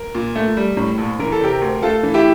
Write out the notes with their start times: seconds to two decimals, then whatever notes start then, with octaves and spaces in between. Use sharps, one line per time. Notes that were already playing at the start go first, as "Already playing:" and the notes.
Already playing: A#4
0.15 A#2
0.35 A3
0.57 G3
0.77 A2
0.98 A#1
1.19 E3 A#4
1.32 A4
1.41 C3 G4 A#4
1.61 D2
1.82 A3 F4 A4
2.03 E3
2.14 E4 G4